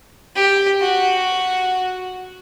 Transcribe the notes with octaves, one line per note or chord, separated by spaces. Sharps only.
G4
F#4